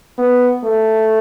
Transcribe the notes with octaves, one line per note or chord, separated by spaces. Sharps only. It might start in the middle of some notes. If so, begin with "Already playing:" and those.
B3
A3